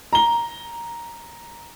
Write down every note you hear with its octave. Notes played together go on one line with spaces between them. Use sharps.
A#5 G7